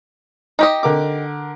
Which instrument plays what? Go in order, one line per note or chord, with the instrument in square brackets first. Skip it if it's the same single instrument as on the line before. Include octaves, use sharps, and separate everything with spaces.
[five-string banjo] D#4 G4 D#5
[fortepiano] D3 A#4 D6